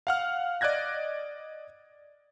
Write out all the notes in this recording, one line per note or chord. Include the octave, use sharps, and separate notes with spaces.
F5 F#5 F6
D5 D#5 F#6 G#6 A#6